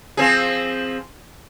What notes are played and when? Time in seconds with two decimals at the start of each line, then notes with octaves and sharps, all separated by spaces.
0.17 F3 C4 G#4